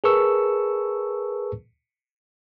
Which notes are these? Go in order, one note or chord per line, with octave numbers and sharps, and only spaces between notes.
G#4 A#4 B4 A5 C#6 E6